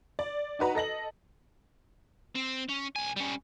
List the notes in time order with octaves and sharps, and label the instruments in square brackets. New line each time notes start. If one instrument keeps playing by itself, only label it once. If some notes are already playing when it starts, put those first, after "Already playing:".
[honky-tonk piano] D5
D#4 F#4 B4 A#5
A4 D#5 A#6 F#7
[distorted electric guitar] C4
C#4
B1 G#5
G3 C#4